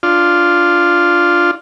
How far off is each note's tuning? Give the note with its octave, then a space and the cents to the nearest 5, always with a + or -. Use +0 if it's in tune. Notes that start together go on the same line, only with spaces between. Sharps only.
D4 +0 F4 +0